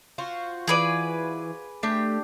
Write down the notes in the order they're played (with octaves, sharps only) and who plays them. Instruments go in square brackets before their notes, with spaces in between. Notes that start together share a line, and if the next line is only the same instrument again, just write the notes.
[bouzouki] F4 F#4 C5
[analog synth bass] E3 [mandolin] G#4 B4 D5
[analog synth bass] A3 [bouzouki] D4 G4 G5